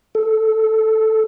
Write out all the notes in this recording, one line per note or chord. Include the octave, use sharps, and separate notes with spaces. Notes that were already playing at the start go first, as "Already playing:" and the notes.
A4